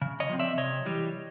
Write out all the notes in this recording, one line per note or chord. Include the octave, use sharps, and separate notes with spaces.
C#3
C#5 D#5
F3 A3 C4
D5 E5
C3 C#5 D#5
E3 G3